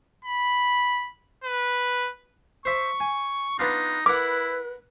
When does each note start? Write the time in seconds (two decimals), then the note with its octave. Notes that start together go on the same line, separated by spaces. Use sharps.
0.25 B5
1.44 B4
2.65 C5 E5 C#6
3.00 G#5
3.59 B3 D4 D#4 F4
4.06 E4 A#4 B4 F#5 D6